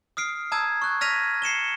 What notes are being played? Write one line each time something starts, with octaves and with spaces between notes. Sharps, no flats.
D#6 F6 C7 D7
A5 A#5 D#6 E6 G#6
C#6 F#6
F6 G#6 A#6 B6 D#7 F7
C7 C#7 E7 G7